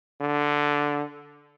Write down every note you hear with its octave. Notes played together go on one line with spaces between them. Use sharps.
D3